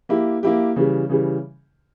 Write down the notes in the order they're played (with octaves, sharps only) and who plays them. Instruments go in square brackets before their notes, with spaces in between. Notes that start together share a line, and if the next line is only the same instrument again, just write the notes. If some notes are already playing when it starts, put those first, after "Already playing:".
[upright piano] A#3 E4 G4
A#3 E4 G4
C#3 E3 G3
C#3 E3 G3